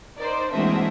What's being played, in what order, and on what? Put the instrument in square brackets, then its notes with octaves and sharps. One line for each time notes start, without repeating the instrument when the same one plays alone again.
[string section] D#4 A#4 [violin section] C5 D5
[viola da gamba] E3 G#3 A#3 [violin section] C4 E5 D#6 [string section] D4 F#4